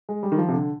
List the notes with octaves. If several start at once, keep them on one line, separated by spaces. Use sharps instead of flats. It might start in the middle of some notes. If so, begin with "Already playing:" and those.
G#3
G3
D#3
F3
C3
D3